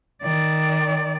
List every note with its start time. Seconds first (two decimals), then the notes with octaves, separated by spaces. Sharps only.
0.24 D#3 D5